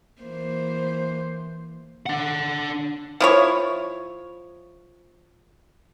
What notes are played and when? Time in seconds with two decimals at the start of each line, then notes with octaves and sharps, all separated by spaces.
0.22 E3 A#3 C5
2.06 D4 F#5
3.20 F3 E4 C#5